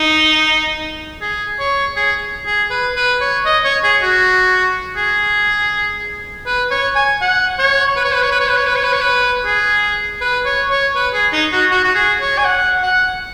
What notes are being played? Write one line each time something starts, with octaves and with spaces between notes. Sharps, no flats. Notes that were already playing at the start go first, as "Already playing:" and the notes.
Already playing: D#4
G#4
C#5
G#4
G#4
B4
B4
C#5
D#5
C#5
G#4
F#4
G#4
B4
C#5
G#5
F#5
C#5
B4
C#5
B4
C#5
B4
C#5
B4
C#5
B4
C#5
B4
C#5
B4
G#4
B4
C#5
C#5
B4
G#4
D#4
F#4
F#4
F#4
G#4
C#5
G#5
F#5
F#5